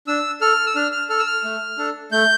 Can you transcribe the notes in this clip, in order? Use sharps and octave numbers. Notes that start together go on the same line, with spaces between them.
D4 E6
A4 F6
E6
D4 F6
F6
A4 F6
E6
F6
A3
D4 A4
A3 G6